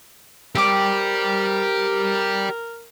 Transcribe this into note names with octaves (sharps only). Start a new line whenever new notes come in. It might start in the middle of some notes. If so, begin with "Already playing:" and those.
C4 G4 A#4 D5 D6